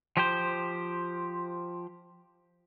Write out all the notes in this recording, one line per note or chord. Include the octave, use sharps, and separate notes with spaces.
F3 G4 C5